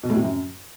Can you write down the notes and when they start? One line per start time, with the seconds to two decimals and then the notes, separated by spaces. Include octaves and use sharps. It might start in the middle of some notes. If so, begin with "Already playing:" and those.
0.03 B2
0.10 A2
0.16 C3
0.23 F#2